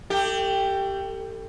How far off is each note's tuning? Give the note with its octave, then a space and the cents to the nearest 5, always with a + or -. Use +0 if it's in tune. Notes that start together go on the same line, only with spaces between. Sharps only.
A3 +35 G4 +0